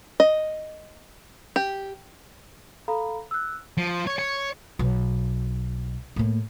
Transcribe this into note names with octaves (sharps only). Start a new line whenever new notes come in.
D#5
G4
A4 F5 A#5 B5
E6 F#6
F3
C#5
C#5
B1
A2 A#3